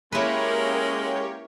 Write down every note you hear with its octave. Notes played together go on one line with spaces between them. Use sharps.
G#3 A#3 C#4 E4 G4 A#4 B4 C#5